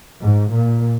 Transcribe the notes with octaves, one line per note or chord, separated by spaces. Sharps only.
G#2
A#2